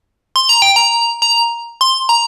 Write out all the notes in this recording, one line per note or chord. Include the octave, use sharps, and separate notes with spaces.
C6
A#5
G5
A#5
A#5
C6
A#5